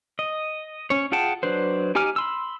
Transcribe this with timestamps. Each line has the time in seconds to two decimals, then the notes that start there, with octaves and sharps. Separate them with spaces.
0.19 D#5
0.90 C#4 C#5
1.12 F4 G#4 F#5 G5 A5
1.43 F#3 D4 B4 C5
1.95 D#4 G4 G#5 D6 F6
2.16 B5 C6 E6